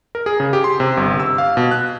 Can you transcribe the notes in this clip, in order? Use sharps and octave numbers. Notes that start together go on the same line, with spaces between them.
A#4
G#4
C#3
G4
C6
C3
G1
E6
F5
B2
F#6